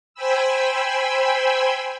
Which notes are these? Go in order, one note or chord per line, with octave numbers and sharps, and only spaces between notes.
C5 G5 G#5 B5 E6